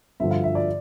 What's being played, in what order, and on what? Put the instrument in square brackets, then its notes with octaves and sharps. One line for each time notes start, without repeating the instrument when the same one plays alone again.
[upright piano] G2 D3 F3 E5
F5
E5
D5